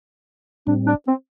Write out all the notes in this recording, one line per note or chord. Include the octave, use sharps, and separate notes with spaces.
A2 G3 C4 D4
D4
C4